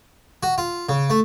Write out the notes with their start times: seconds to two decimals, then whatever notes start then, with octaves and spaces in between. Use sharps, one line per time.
0.43 F#4
0.58 F4
0.89 C#3
1.10 A3